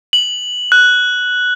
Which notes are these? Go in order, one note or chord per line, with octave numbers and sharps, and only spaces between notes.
F#7
F#6